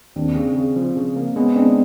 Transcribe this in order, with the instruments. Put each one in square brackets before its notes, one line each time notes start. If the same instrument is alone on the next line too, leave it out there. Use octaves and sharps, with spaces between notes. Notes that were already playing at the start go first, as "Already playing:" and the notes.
[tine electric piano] D#2 [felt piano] C4 D4
[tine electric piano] C#3
C#3
F3
C#3
A#3
[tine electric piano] G#3 [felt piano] B3 C#4
[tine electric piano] G#3 [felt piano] C4 D4